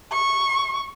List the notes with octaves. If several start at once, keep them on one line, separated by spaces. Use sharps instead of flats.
C#6